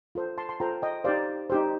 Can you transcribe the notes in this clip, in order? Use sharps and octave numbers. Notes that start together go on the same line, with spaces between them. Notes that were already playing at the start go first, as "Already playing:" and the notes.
F4 A4 C5
A5 C6
A5 C6
F4 A4 C5 G5 A#5
D#5 G5
D#4 G4 C5 D5 F5
D#4 G4 C5